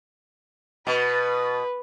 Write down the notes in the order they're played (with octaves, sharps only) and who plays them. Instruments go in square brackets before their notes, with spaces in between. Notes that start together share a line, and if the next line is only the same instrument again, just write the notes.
[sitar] B2 [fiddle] B4